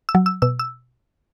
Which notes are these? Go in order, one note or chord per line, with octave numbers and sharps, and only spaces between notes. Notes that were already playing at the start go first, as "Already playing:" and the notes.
E6
F#3
E6
B2 E6
E6